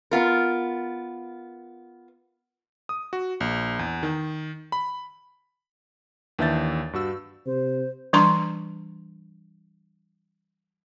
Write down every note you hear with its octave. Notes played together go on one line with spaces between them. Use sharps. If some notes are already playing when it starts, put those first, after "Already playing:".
B3 F4 A#4
D#6
F#4
A#1
E2
D#3
B5
D#2 E3 D4 E5 G6 A6
G2 F#4 E6
C3 C5
E3 G3 D4 A#5 C6 C#6